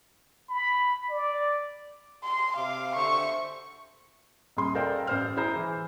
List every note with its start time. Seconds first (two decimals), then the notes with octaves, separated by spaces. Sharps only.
0.49 B5
1.10 D5
2.24 C6
2.56 C3 F5 D6
2.95 D3 C5 E5 C#6
4.57 D#1 G#4 C6
4.75 A4 A#4 C5 D5 F5 G5
5.07 A1 C5 F6
5.36 E4 G#4 C5 A#5
5.56 E3